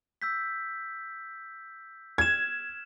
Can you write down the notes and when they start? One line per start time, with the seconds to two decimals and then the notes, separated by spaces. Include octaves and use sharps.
0.22 E6 G6 B6
2.18 F6 G#6 E7